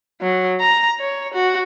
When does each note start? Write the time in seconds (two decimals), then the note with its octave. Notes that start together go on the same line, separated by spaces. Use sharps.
0.22 F#3
0.60 A#5
1.00 C#5
1.34 F#4